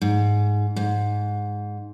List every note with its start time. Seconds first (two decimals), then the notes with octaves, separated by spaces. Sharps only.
0.02 G#2
0.76 G#2